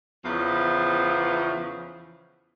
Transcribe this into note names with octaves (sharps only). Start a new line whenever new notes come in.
E2 C#3 E3 F3